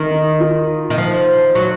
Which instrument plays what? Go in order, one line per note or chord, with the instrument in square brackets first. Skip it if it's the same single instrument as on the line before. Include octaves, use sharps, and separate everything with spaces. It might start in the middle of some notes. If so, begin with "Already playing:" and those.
Already playing: [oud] D#3
[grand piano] D#4
F4
[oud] D#3
F3
F#3